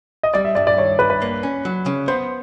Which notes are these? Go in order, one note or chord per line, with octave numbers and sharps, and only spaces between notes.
D#5
G3 D5
E5
G2 D5
D5
D#3 C#5
G2 B4
B4
A#3
C#4
F#3
C#3
B3 C5